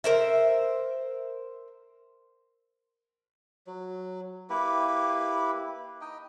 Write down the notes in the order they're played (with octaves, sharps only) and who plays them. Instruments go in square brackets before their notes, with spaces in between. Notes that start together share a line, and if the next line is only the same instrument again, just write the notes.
[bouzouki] A#4 C5 E5
[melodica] F#3
A#3 E4 G4 B4
D#4 D#5 G5